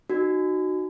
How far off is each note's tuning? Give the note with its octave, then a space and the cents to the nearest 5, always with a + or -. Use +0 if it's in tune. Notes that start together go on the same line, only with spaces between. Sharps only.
D#4 -25 F#4 +0